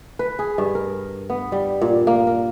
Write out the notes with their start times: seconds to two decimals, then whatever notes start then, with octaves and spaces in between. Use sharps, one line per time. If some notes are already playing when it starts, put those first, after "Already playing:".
0.19 B4
0.39 G#4
0.58 G2
0.75 A#4
1.30 B3
1.52 G3
1.81 A#2
2.07 A#3
2.27 A#4